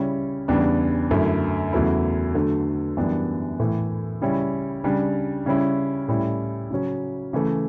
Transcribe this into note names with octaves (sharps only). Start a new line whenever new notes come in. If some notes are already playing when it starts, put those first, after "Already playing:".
Already playing: C#3 G3 C#4 E4
E2 C#3 G3 B3 D4
F#2 D3 A3 E4
E2 C#3 F#3 A3 E4
D3 F#3 A3 D4
F#2 E3 G3 B3 D4
A2 E3 A3
C#3 G3 C#4 E4
C#3 G3 D4
C#3 G3 C#4 E4
A2 G3 C#4 E4
C#3 F#3 C#4
C#3 E3 A3